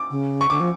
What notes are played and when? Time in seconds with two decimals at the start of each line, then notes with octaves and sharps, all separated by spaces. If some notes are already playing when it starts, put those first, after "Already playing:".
Already playing: D6
0.10 C#3
0.41 C#6
0.50 D3 D6
0.60 F3